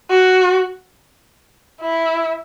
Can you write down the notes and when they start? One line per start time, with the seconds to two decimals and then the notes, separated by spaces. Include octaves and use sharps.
0.10 F#4
1.81 E4